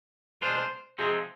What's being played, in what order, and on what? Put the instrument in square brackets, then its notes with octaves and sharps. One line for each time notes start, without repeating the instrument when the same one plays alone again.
[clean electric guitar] B2 G#3 D4 F4 [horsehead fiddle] C5
[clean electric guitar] C3 F3 G#3 C4 D#4 [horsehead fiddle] G#4